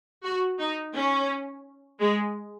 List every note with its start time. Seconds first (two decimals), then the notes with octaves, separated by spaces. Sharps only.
0.24 F#4
0.59 D#4
0.94 C#4
2.00 G#3